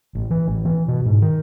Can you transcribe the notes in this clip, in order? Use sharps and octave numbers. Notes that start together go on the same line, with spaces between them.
A1
E3
A1
E3
B2
G#2
D#3